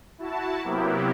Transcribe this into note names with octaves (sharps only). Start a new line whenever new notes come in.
E4 F#4 A5
C3 F#3 A#3 B3 E4 G4